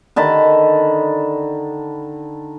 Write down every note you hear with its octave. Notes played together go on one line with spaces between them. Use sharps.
D3 D#3 A5 B5